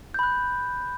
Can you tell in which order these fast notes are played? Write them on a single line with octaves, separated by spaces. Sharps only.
G6 B5 F#6